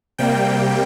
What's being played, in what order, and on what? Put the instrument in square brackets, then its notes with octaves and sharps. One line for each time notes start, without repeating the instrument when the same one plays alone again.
[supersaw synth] C3 G3 A#3 G5